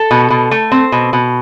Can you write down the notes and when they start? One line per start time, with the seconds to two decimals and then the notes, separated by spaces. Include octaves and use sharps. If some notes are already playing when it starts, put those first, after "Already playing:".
Already playing: A4
0.11 B2
0.30 B2
0.51 A3
0.72 C4
0.92 B2
1.13 B2